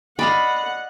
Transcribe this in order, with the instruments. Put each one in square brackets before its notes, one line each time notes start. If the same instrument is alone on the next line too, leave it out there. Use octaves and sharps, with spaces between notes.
[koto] D5 D#5 F5 [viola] F#5 [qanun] B5